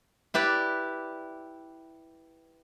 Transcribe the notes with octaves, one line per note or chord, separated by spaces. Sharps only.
E4 G4 B4 D5